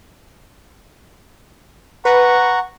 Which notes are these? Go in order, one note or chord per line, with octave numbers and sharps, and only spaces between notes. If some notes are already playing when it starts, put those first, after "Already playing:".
B4 F#5 A#5 C#6